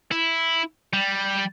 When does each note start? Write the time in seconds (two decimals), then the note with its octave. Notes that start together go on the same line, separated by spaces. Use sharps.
0.12 E4
0.93 G3